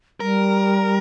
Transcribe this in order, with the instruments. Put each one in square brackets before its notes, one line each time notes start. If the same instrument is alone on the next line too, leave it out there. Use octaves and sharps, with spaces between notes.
[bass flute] G3 [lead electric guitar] A#4